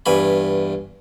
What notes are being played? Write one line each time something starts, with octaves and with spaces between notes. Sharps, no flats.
E2 G2 G#5 B5